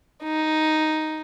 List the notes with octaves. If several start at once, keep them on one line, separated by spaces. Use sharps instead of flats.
D#4